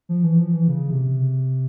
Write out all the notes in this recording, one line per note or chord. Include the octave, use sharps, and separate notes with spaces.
F3
E3
F3
E3
C#3
C3